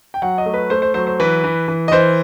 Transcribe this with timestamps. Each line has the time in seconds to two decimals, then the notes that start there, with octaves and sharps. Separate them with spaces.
0.14 G5
0.22 F#3 F#5
0.38 D#5
0.46 A3
0.54 B4
0.70 A3 C5
0.82 C5
0.94 F#3 C5
1.07 C5
1.20 E3 B4
1.44 E3
1.68 E3
1.88 D#5
1.92 E3 C5